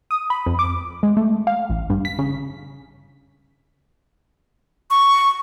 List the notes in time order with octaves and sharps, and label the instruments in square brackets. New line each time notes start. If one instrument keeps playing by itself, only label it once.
[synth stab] D#6
B5
F2
D6
G#3
A3
F5
A1
G2
B6
C#3
[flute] C#6